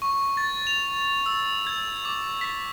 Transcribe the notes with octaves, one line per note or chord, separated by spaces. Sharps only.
C#6
A6
F7
E6
G#6
D6
B6